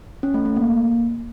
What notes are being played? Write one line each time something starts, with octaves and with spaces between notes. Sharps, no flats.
C#4
A3
A3
A#3